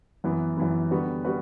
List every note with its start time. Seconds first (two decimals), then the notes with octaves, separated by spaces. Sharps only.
0.24 F#2 E3 B3
0.57 F#2 E3 B3
0.91 D3 G3 B3 F#4 B4
1.25 G3 B3 F#4 B4